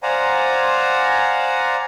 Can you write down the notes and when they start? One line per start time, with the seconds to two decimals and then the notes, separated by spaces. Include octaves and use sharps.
0.03 C5 D5 F5 F#5 G#5 A#5